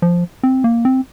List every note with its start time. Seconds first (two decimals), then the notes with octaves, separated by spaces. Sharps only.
0.02 F3
0.43 C4
0.64 A#3
0.85 C4